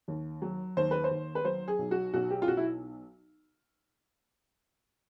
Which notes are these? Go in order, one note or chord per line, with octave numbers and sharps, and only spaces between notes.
D#2
F#3
D#2 C5
B4
C5
D#2
B4
F#3 C5
G#4
B1
F#4
B1 F#4
G4
F4
B1 F#4
E4